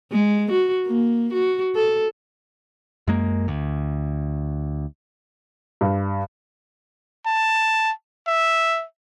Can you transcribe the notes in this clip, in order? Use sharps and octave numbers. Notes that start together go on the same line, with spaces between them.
G#3
F#4
A#3
F#4
A4
F#2 G#3 A#3
D2
G2
A5
E5